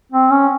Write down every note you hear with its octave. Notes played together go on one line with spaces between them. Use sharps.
C4
C#4